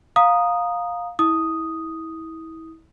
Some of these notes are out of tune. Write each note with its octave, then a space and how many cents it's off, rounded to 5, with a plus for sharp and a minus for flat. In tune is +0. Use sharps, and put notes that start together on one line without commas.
F5 +15 A#5 +5 D#6 -5
E4 -30 D#6 +0